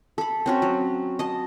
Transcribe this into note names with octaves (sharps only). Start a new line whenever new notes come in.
A4 B5
C4 C#4 F#4
F#3
D#5 A5